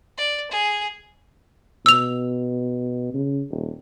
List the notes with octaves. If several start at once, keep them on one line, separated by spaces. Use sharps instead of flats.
D5
G#4
B2 E6 F7
C#3
D#1